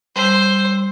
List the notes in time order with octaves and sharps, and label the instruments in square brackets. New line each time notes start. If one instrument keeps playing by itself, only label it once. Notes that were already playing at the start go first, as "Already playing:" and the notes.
[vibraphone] G3 E6 [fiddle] C5